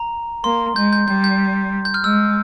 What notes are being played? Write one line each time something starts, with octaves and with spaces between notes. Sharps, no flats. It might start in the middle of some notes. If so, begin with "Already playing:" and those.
Already playing: A#5
A#3 C6
G#3 G6
G6
G3 G6
G6
G6
F6
G#3 E6